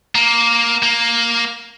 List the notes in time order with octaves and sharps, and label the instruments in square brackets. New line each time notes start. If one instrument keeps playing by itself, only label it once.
[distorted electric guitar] A#3
A#3